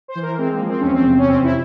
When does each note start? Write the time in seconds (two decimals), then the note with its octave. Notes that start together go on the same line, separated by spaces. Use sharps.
0.08 C5
0.15 E3
0.22 A#4
0.37 G#3 C4
0.53 A#3
0.60 F3
0.68 C4
0.80 E2 C#4
0.92 C4
1.06 C3
1.18 C#4
1.28 F2 C4
1.44 E4